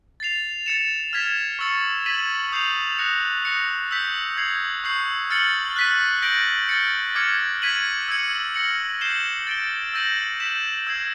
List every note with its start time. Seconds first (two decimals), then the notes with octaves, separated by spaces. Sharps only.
0.20 A6 C7 F7
0.66 A6 C#7 E7
1.13 F6 G#6 B6 E7
1.59 C#6 E6 A6 C#7
2.06 G#6 B6 D#7 F#7
2.52 D#6 G6 C7 F7
2.98 D#6 F#6 A#6 C#7
3.45 D#6 F#6 A#6 C#7
3.91 E6 G6 B6
4.37 D#6 G#6 C7
4.84 C#6 E6 G6 C7
5.30 F6 A6 C#7 F#7
5.76 F#6 B6 D#7
6.22 G6 A#6 D7 F#7
6.69 F6 A6 C#7
7.15 D6 F6 G#6 C#7
7.62 G#6 B6 D#7 F#7
8.08 E6 G#6 C#7
8.54 F6 A#6 C#7 F#7
9.01 G6 C7 E7 G7
9.47 A6 D7 G7
9.94 E6 G6 A#6 D#7 F#7
10.40 G6 B6 E7
10.87 E6 G#6 C7